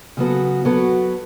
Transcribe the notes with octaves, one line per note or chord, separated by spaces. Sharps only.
C#3 F#3 B3 F#4 A4
F#3 B3 F#4 A4